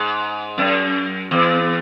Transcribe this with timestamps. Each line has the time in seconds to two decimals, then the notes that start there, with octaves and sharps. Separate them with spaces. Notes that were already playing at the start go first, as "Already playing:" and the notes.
Already playing: G#2
0.58 F#2
1.31 E2